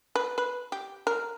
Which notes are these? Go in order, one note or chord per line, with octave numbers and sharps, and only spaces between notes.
B4
B4
G4
A#4